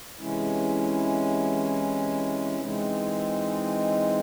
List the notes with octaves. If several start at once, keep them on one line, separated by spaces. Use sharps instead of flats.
C3 E3 G#3 C#4 E4
E3 G#3 C4 D#4